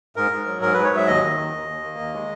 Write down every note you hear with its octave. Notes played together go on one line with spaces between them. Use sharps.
G#2 A#4
G#2
F#3
G#2 A#4
G#2 B4
C#5
F#3 E5
D#2 D#5
D#3
D#2
D#2
D#2
A#3
D#2
G#3